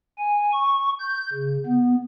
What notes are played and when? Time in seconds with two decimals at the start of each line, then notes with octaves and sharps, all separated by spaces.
0.18 G#5
0.53 C#6
0.99 G6
1.33 C#3
1.66 B3